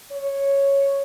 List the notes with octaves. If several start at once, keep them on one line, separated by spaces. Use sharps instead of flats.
C#5